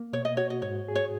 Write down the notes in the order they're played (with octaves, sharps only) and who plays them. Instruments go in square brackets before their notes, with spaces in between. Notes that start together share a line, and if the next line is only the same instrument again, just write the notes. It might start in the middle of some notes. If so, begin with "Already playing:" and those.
Already playing: [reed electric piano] A#3
[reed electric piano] B2 [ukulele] C#5
[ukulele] D#5
[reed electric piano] F#4 [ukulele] C#5
[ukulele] D#5
[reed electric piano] G#2 [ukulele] C#5
[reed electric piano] G#4
[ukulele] C#5